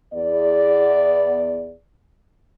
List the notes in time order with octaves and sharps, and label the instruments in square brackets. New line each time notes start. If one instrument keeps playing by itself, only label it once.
[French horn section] E2 B3 D5